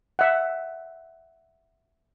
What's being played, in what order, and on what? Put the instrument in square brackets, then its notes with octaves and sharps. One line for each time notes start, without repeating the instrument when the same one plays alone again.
[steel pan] E5 F#5